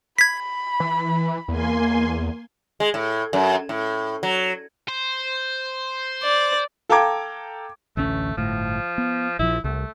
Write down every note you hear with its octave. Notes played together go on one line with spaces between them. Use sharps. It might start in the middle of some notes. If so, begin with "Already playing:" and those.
B5 G#6 B6
E3
E2 A#3 G#5 C6
G#3
A2
F#2
A2
F#3
C5
D5
A4 F5 G5 A#5 D6 G#6
A1 D2 A3 C#4
G1 A2 F3
B3
A#1 F3 E4
C2 A3